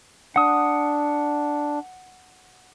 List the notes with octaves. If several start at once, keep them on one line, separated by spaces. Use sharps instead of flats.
D4 F#5 D#6